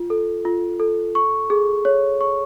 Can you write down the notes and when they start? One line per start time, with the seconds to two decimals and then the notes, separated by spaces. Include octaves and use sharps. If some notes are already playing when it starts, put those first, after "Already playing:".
Already playing: F4
0.10 A4
0.45 F4
0.80 A4
1.15 C#6
1.50 G#4
1.85 C#5
2.21 C#6